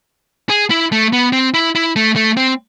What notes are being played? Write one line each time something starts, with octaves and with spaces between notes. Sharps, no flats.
G#4
E4
A3
B3
C4
E4
E4
A3
A3
C4